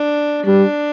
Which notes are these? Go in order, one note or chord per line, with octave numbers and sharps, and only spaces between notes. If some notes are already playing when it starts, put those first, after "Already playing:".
Already playing: D4
G3 D4